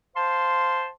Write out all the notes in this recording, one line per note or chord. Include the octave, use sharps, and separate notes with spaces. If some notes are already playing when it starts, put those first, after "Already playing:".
C5 F5 A5 C6